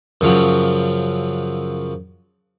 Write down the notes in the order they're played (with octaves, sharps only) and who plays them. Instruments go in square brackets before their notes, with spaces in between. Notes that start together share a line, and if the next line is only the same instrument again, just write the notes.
[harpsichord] F#2 C#3 F3 F#3